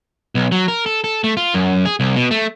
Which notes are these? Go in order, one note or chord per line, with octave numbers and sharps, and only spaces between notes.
B1
F#3
A#4
A4
A4
A3
F4
F#2
G#4
C2
B2
A3